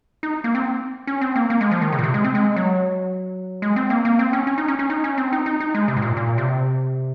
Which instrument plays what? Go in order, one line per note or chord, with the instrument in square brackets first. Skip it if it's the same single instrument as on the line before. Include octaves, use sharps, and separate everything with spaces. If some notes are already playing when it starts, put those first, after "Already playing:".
[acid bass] D#4
A#3
C4
C#4
C4
A#3
A#3
G#3
F3
D#3
C#3
A#2
C3
G#3
C4
G#3
F#3
G#3
C4
A#3
A#3
C4
C#4
C#4
D#4
C#4
C#4
D#4
C#4
C4
D#4
D#4
D#4
G#3
C3
G#2
A#2
A#2
C3